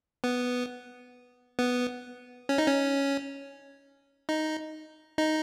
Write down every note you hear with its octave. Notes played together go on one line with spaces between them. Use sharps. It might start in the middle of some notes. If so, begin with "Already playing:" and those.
B3
B3
C#4
D#4
C#4
D#4
D#4